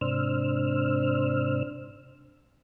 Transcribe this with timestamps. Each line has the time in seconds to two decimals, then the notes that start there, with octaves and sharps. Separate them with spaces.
0.01 G#2 C3 D4 C5 E6 F6